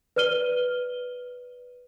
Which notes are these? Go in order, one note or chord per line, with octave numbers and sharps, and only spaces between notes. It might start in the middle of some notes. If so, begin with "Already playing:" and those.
B4 D5 F6 D#7 G7